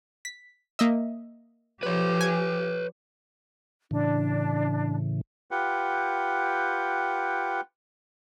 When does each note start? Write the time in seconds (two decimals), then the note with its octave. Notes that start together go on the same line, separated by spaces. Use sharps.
0.25 B6
0.79 A#3 D#5 E5
1.83 F3 G4 B4 C#5
2.21 G#5
3.91 A2 C#3 E3 D4
5.51 F4 G4 B4 F#5 G5